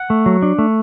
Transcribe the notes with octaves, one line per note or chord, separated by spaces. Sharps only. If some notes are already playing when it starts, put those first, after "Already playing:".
Already playing: F#5
A3
F#3
D4
A3